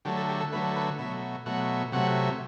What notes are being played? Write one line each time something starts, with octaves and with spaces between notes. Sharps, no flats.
D3 F#3 A3 G4
A4
G4
A4
D3 F#3 A3 B4
B4
B2 F#3 A3 E5
B2 F#3 A3 F#5
C3 F#3 A3 F#5